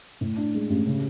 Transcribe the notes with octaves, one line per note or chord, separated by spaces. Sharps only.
A2
D4
G#3
A1
C#3